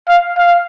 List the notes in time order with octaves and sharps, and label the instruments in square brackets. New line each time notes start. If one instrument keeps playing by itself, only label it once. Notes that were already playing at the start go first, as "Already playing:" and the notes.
[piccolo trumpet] F5
F5